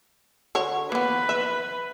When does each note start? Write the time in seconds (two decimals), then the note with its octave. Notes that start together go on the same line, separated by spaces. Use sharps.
0.55 D3 F#4 C#5
0.92 A#3 B3 B4
1.29 E5